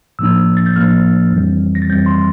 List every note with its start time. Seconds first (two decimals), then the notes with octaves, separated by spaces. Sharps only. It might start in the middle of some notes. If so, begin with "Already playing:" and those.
0.19 A2 F3 A#3 D4 E6
0.57 A6
0.66 G6
0.76 A2 F3 A#3 D4 F6
1.32 F2 E3 G3 C4
1.75 A#6
1.82 A6
1.89 F2 E3 G3 C4 G6
2.06 C6